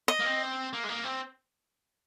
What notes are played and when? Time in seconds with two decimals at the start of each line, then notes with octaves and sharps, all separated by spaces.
0.08 D#5
0.20 A#3
0.25 C4
0.73 A#3
0.84 G#3
0.89 A#3
1.04 C4